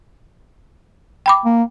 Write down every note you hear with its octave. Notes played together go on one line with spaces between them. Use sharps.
G5 B5 D6
A#3